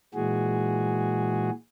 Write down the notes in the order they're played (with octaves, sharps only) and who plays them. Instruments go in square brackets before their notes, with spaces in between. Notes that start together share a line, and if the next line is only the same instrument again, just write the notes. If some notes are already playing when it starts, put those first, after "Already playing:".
[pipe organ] A#2 E3 G#3 F#4 G#4